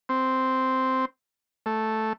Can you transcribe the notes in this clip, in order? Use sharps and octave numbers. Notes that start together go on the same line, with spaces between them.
C4
A3